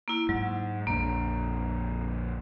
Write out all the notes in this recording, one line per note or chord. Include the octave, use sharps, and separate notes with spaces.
A#3 E4
G#2 F#3
A#1 F2 A#3 D4